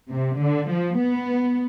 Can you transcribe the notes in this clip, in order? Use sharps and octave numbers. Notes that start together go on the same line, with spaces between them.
C3
D3
F3
B3